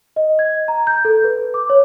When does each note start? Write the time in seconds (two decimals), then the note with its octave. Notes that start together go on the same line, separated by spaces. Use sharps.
0.16 D#5
0.39 G#6
0.68 A#5
0.87 G6
1.05 A4
1.24 B4
1.54 D6
1.70 C#5